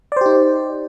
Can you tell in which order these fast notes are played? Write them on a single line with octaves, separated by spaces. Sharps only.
D5 C5 G4 D#4